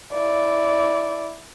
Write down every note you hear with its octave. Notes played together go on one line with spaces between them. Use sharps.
E4 D5